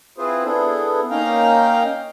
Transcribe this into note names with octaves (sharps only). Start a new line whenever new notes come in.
C4 E4 F4 G#4 B4 C5
B3 D4 E4 G#4 A4
A#3 C#4 D#4 F5 G5 A#5